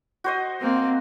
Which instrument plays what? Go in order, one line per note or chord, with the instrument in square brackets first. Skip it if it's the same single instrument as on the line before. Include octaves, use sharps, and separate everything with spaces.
[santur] F#4 C5 D#5
[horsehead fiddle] A#3 C4